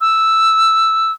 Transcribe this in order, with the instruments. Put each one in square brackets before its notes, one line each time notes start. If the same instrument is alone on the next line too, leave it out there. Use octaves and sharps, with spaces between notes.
[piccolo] E6